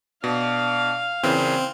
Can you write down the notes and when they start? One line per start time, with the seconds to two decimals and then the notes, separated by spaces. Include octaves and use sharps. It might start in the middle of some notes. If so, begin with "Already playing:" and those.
0.24 B2 D4 F5
1.24 A#2 C#3 E3 C4